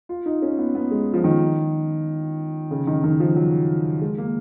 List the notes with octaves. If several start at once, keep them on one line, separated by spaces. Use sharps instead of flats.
F4
D#4
C#4
B3
B3
G#3
F3
D#3
C#3
D#3
D#3
F3
F#3
G#3
A#3